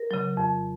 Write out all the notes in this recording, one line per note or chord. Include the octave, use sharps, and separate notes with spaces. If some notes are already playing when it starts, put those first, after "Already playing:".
Already playing: A#4
C#3 F#3
F2